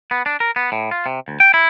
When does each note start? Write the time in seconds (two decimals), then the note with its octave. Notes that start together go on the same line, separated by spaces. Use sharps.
0.11 B3
0.26 D4
0.40 A#4
0.56 B3
0.72 A2
0.91 F4
1.06 C3
1.28 D2
1.40 G5
1.54 E4